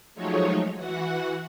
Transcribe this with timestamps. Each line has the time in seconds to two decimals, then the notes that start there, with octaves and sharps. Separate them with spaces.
0.15 F3 F#3 G#3 A3 D#4 C#5
0.77 E3 F#4 F#5